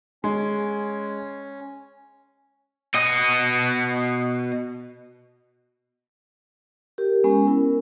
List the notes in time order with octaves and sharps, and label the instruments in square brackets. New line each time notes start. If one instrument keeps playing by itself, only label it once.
[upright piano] G#3 [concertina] C#4
[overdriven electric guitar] B2 D#5
[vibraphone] G4 A#4
G#3 B3 C#4 G#5
E4 A#4